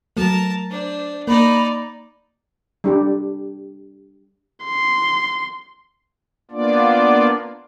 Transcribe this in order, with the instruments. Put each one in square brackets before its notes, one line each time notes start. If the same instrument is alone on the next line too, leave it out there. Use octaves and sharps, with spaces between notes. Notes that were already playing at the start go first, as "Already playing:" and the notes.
[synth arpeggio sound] F#3 A3 [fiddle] A#4 A5
[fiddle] D4 [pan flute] C5
[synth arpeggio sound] A#3 [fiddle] D#4 D5 [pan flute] B5
[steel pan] G3 D4 G4
[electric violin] C6
[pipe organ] A#3 B3 D4 F4 D5